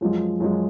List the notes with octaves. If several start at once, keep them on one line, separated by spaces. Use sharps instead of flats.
F#2 F3 G#3
F#2 F3 G#3